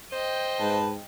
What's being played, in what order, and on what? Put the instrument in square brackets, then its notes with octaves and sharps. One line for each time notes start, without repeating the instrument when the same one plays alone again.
[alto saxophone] C5 [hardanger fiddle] D#5 G5
[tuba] G#2 [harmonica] B4 A5